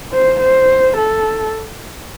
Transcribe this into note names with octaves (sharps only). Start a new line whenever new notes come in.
C5
C5
A4